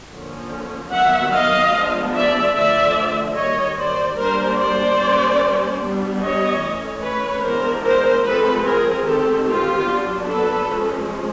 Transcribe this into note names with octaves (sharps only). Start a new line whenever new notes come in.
D3 F3 A#3 C#4
D#3 F#3 B3 E5 F#5
D#5 F5
F3 G#3 B3 D4
D5 E5
D3 F3 A3 D5 E5
D#3 G3 A#3 C#5 D#5
C5 D5
G3 A#3 D4 A#4 C5
C5 D5
G3 A#3 C#4
G3 B3 D4
C#5 D#5
E3 A3 C#4
B4 C#5
E3 G#3 B3 D4 A#4 C5
A#4 C5
F3 G#3 C4 A4 B4
G#4 A#4
D#3 G#3 C4 G4 A4
F4 G4
F#3 B3 D4
A4 B4
F3 G#3 C#4